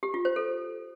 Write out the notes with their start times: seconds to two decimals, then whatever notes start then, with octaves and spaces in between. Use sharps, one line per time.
0.03 G4
0.14 F4
0.25 C5
0.36 A4